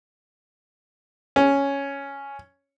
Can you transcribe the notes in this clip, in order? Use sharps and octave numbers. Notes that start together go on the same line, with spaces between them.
C#4